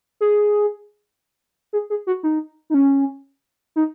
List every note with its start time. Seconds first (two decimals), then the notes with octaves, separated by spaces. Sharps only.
0.21 G#4
1.73 G#4
1.90 G#4
2.07 F#4
2.23 D#4
2.70 D#4
2.74 C#4
3.76 D#4